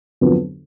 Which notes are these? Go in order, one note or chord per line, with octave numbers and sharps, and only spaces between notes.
F2 D3 F#3 B3 D4